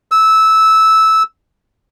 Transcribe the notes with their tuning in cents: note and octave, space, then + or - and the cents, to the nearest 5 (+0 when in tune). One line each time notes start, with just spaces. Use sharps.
E6 -15